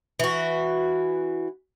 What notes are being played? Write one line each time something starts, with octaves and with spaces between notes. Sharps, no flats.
E3 F#4